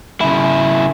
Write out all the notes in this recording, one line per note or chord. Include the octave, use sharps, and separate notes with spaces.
C#3 E4